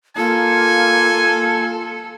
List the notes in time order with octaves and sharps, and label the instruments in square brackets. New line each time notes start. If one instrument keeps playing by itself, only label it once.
[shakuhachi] A#3 [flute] F4 [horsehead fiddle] A4 [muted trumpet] G#5